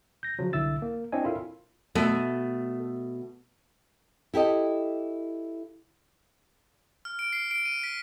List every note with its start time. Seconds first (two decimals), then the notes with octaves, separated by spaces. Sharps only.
0.23 G6 A#6
0.39 C#3 F3 F#3
0.53 C2 D3 E4 E5 E6 A6
0.82 A#3
1.12 C4 D4 E4 C#5 D#5 G#5
1.24 E4 F4 A4 A#4 E5 F5
1.95 B2 A3
4.34 E4 G4 A4 D#5
7.05 F6
7.19 D7
7.33 C7
7.51 D7
7.65 D#7
7.83 B6